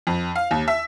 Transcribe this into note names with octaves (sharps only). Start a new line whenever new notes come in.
F2
F5
D#2
E5